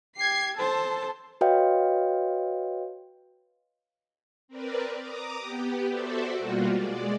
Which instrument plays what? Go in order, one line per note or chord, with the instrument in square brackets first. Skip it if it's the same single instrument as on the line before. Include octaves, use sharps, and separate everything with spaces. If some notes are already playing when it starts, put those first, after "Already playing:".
[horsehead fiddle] G4 [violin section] G#6 C7
[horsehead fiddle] A4 C5 [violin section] A5
[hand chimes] F#4 B4 C#5 D#5 F5 G5
[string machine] C4 A#4 B4 D5
A#5 D6 D#6
B3 G4
F#4 A4 C5 D5 E5
B2 G3 A#3 F4 F#4
G#3 D5